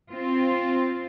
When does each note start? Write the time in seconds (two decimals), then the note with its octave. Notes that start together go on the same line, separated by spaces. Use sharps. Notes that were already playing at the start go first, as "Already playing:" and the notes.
0.11 C4 F4